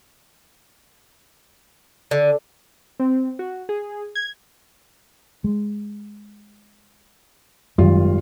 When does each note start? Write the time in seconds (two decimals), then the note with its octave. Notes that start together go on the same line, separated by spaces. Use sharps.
2.11 D3
3.00 C4
3.39 F#4
3.69 G#4
4.15 G#6
5.44 G#3
7.78 G#1 F#2 D#3 G3 F4